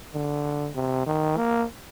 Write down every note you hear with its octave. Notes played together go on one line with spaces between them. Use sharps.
D3
C3
D#3
A#3